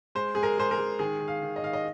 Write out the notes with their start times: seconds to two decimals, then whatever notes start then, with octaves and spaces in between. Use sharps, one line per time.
0.15 G#3 C5
0.35 G#3 G#4
0.43 A#4
0.58 G#3 C5
0.71 A#4
0.79 G#3
0.99 D#3 G#4
1.20 D#3
1.28 F5
1.42 D#3
1.56 D#5
1.63 D#3 F5
1.73 D#5